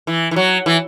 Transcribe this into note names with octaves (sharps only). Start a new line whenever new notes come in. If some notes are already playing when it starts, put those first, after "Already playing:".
E3
E3
F#3
E3